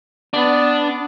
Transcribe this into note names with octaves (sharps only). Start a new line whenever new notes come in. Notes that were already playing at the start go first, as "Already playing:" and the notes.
B3 D4